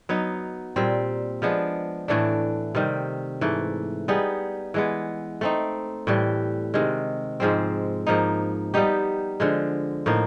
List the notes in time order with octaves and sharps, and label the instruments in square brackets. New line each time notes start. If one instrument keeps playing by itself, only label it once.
[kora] F#3 B3 D#4
A#2 G3 C4
F3 G#3 B3 D4
A2 E3 A3 D4
C3 D#3 G3
G#2 E3 A3
G3 B3 D#4 G#4
E3 G#3 B3
A3 C4 D#4
A2 E3 G3
C3 D#3 G#3
G#2 F3 G#3 C4
G#2 F3 A#3 D#4
G3 B3 D#4 G4
D3 F3 G#3
A2 F3 A#3 D#4